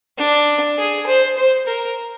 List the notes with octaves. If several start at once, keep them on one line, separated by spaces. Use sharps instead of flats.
D4
G#4
C5
C5
A#4